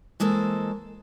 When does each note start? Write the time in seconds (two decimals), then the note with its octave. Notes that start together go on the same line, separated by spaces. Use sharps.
0.20 E3 G#3 A#3 A4 C5